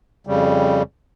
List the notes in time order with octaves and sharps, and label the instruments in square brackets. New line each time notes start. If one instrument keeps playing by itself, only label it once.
[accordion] F2 C#3 G3